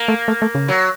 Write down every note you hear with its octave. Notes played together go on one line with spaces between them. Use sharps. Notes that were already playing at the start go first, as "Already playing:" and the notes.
Already playing: A#3
A3
A3
A3
C#3
F#3